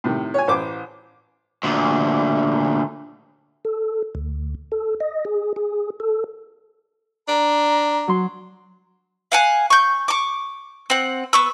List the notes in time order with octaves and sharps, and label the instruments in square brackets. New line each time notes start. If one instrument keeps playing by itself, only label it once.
[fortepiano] A2 C3 D#3
C#5 G#5
A1 C5 D6
[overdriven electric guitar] D2 A#2
[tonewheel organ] A4
D2
A4
D#5
G#4
G#4
A4
[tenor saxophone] D4 [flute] A#5
[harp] F#3 C6
[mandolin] F5 F#5 G#5
C#6 G6
C#6 D6
C4 F#5
B3 C#6 E6